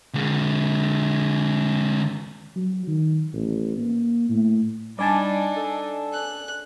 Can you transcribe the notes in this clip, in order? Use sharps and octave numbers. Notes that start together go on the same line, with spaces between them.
D3 G#3
F#3
D#3
A1
A#3
A2
G3 D4 D#4 D5 G#5 A5
A4
F#6